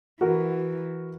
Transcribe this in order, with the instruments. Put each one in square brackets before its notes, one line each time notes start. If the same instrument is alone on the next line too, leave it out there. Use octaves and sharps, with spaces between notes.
[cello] E3 [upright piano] F#4 A#4